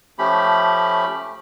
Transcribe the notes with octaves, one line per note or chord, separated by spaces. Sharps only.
F3 A3 C#4 G4 B5